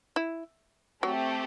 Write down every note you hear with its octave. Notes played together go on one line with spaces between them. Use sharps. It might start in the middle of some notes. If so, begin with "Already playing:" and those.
E4
F#3 A3 C4 G4